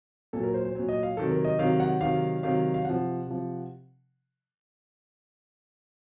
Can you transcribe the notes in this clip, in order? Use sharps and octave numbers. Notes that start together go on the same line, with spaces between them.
A#2 F#3 A4
A#4
C5
C5
A#2 F#3
D#5
F5
C3 D#3 F#3 A4
A#4
D#5
C3 D#3 F#3 F5
F#5
C3 D#3 F#3 F5
C3 D#3 F#3 F5
F5
C3 F3 F#5
C3 F3